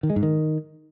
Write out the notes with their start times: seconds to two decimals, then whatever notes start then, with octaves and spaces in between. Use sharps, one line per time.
0.03 D#3
0.10 G#3
0.16 G#2
0.23 D#3